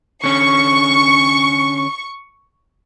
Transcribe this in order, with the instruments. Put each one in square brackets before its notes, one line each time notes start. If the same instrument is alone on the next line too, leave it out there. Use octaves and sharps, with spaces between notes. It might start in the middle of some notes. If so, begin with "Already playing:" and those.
[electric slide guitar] D3 C#4 [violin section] C#6